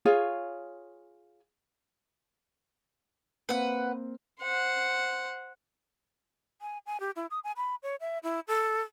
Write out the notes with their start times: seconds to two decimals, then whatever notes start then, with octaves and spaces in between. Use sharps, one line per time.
0.05 F4 G#4 C#5 G#5
3.49 A#3 C4 B4 F#5
4.41 C5 F#5
6.61 G#5
6.86 G#5
7.00 G4
7.16 E4
7.31 D#6
7.44 G#5
7.57 B5
7.83 C#5
8.00 E5
8.23 E4
8.48 A4